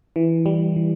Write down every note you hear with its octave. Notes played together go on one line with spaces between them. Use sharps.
E3
G3
E3